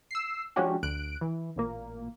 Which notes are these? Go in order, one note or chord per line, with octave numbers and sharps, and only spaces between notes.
E6 C7
F3 G#3 C#4 D4 F#4 G4
D2 F#6 D7
E3
A1 A#2 A#3